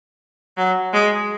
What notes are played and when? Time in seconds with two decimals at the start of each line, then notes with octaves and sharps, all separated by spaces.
0.57 F#3
0.93 G#3